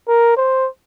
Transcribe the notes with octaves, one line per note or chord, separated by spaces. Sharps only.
A#4
C5